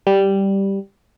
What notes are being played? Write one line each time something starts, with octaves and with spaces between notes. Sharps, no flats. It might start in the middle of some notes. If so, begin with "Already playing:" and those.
G3